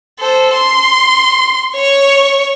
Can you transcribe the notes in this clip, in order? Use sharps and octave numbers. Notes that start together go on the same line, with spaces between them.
A4 C5
C6
C#5 C#6